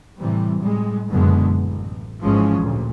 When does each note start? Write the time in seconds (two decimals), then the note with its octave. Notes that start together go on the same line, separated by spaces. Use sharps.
0.19 A2 C3 E3 G3
0.60 A2 G3 G#3
1.12 F#1 F#2 B2 D3 G#3 B3
1.59 A1
2.22 G#1 G#2 E3 F3 G#3 C#4
2.60 D2 A#2